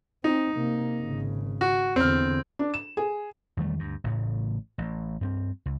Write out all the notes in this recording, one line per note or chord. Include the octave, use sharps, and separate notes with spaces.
C4 D#4
C3 A#3
G#1 C#3
F#4
E2 D3 C4 F6
D4
E7
G#4
E2 D#3 G3 A3
D2 G2
A1 A2 C#3
A1
G2 B3 C4
C#2